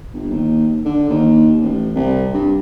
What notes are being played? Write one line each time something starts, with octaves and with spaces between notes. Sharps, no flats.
G1
D#2
D3
D#2
A1
C2
G2